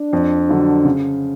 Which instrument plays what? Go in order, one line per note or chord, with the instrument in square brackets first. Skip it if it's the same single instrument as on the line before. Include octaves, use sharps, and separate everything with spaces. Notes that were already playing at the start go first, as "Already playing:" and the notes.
Already playing: [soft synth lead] D4
[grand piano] F2
D3 F#3
C#3